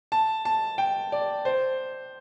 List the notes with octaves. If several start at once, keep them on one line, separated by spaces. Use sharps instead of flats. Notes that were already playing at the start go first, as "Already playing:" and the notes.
A5
A5
G5
D5
C5